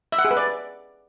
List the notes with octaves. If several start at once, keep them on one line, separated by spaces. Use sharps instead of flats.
E5
F#5
G#4
B4
D5